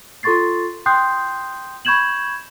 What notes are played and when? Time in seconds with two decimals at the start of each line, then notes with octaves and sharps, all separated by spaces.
0.23 F4 A4 C6 C#6 A6 C7
0.86 G5 C6 D#6 F#6 G6 C7
1.85 B5 C#6 G6 G#6 E7 F#7